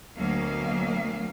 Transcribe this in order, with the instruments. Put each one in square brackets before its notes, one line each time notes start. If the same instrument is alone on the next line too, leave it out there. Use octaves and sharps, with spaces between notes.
[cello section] D2 B2 F#3 A#3 F5